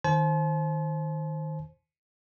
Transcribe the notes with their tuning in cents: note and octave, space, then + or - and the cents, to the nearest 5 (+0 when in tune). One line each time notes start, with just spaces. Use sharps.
D#3 +0 C5 +10 A5 -45